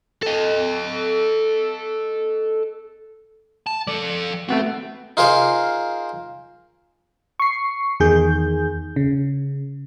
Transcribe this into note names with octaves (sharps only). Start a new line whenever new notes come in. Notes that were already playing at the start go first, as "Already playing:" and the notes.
A4 D#5
A5
F3 A4 D5
A3 B3 C4 F#4
D#4 F4 G#4 A#4 C5 F5
C#6 C7
E2 D#3 G#4 G6
C#3